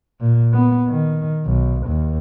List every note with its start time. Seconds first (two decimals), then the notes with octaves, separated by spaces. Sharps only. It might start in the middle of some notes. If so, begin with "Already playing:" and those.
0.21 A#2
0.53 B3
0.89 D#3
1.46 B1
1.86 D#2